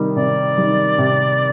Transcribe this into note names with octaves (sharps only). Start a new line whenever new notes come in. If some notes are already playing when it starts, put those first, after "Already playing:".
Already playing: C3 D#3 G3
C3 D5
D#3 G3
C3